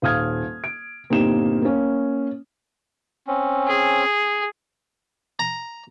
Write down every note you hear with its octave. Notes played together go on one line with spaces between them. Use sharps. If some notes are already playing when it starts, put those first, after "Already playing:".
D#1 F5 D#6 F6 G#6
D7
G1 A#2 C4 D#4 G4 E7
A#3 C#4
C4 C#4
G#4
A#5